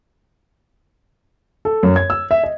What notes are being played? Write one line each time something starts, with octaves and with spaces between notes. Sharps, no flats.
A4
F#2
G#6
E6
E5
D#5